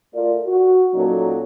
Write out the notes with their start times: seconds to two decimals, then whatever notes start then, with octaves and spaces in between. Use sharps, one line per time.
0.14 A3 F4 A#4 D5
0.46 F#4
0.93 A#2 F#3 C#4 D#4 A4